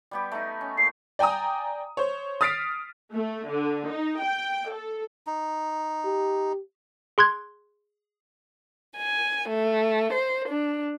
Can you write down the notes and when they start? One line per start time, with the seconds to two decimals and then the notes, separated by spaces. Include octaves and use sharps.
0.11 G3 B3 G4
0.32 A3 D#4
0.61 C#4
0.77 A#2 C7
1.19 D5 G5 G#5 A#5 D#6
1.97 C5 C#5
2.41 D#6 F6 A6 B6 C7 D7
3.14 A3
3.50 D3
3.91 D#4
4.23 G5
4.72 A4
5.27 D#4
6.05 G4
7.18 G#4 C6 F#6 G#6
8.97 G#5
9.48 A3
10.11 C5
10.47 D4